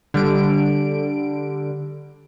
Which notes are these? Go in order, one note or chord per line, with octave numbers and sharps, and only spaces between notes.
D3 G3 D7